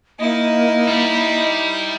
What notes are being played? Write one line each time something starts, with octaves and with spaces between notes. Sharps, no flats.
A#3 D#4 E4 D#5
G3